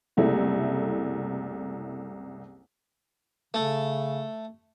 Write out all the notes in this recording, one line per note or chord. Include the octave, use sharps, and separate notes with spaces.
F#1 C2 A3 E4
C#3 A3